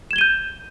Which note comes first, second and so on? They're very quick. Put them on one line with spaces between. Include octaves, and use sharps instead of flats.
E7 G#6 G7 D#7 G6